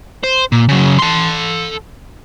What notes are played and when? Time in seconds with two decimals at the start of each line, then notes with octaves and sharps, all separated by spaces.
0.23 C5
0.52 A#2
0.69 C#3 F#3
0.99 A4 C6